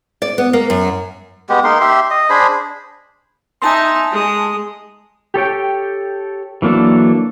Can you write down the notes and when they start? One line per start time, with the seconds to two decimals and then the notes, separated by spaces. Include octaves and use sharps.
0.22 D5
0.38 B3
0.53 A#3
0.70 F#2
1.49 G#3 B3 G4
1.64 A#3 D#4 C6
1.81 G4 E5 C6
2.11 D#5
2.30 D4 G#4 C5 B5
3.62 D#4 E5 G#5 A5 C6
4.12 G#3 D#6
5.34 G4 A4 C#5 G5
6.62 E3 F#3 A#3 D4 A4